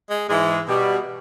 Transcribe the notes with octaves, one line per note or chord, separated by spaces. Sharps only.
G#3
G#2 E3 G#3
B2 G3